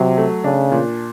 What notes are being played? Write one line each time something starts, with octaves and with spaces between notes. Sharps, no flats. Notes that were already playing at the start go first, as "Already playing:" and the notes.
Already playing: C3 F#3
A3
C#3 D4
A#2